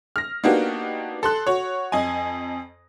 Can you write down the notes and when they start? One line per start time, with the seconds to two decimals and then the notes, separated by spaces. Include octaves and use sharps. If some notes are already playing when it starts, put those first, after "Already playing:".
0.16 F6 A#6
0.44 A#3 B3 D4 D#4 F#4 G4
1.23 A4 C6 F#6
1.47 F#4 C#5
1.92 F2 D#5 G#5